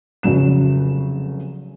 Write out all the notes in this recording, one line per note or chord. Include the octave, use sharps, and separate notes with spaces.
F1 C#3 F#3 E7